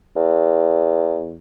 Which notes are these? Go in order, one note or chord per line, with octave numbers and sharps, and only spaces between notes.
E2